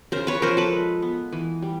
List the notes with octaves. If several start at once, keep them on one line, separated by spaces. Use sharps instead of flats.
C#3 A#4 C5
B4 C#5
F3 A#4 C5
A4 B4
G#3
B3
E3
G3